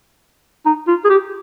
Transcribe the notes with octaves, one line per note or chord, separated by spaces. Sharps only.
D#4
F4
G#4
G4